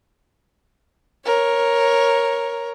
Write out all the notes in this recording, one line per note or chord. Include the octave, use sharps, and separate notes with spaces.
A#4 C#5